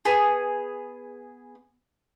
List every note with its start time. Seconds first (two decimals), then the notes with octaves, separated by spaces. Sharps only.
0.05 B3 G#4